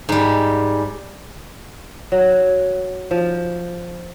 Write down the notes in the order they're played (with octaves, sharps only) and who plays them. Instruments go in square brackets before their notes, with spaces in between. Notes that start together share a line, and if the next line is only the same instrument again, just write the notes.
[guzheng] G#2 G3
[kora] F#3
F3